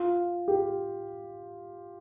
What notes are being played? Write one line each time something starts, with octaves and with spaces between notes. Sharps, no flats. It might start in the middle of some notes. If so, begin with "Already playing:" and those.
Already playing: F4
G4